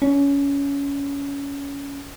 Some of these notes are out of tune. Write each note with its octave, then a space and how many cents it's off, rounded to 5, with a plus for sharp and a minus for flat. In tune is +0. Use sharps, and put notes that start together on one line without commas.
C#4 +20